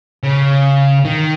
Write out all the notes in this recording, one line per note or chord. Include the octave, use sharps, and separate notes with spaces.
C#3
D#3